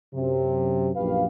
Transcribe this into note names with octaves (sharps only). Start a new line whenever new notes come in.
F#2 C3
A#1 F#2 G4 B4 F5